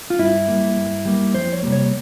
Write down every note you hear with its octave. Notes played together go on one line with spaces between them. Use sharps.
F4
G2 E4
G3 A#3
G2
G3 A#3
F2 C5
C#5
C3 G3 A#3
C#5